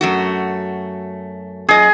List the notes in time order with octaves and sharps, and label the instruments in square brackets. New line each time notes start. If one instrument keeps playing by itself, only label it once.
[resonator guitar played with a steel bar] F#2 A3 F#4
[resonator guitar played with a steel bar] F#2 D#5 [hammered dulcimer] G#4